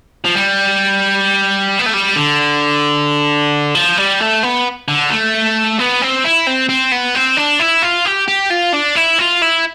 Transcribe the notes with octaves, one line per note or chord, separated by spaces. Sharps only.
F3
G3
B3
A3
G3
D3
F3
G3
A3
B3
D3
A3
B3
C4
E4
C4
C4
B3
C4
D4
E4
F4
G4
G4
F4
D4
E4
F4
E4